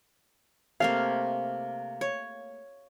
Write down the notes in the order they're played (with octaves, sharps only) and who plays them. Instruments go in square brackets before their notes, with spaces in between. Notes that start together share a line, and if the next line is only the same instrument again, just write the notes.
[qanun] C3 A3 A#3 [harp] F5
[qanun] C#5